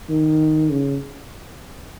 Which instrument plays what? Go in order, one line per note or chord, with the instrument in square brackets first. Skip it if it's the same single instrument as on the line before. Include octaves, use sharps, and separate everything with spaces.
[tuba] D#3
C#3